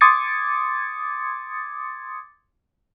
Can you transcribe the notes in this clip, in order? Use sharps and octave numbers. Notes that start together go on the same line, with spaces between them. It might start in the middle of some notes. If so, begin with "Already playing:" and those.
C6 D6 D#6 G#6 A6 C#7